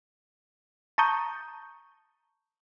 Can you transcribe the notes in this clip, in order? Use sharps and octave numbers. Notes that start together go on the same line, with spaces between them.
A5 A#5 C#6 D#6 G6